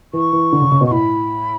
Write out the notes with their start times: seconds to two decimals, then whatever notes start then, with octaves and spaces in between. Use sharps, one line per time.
0.13 E3 C#6
0.33 E3
0.52 D3
0.61 C#3
0.72 C#3
0.81 B2
0.86 C#6
0.91 A2 B5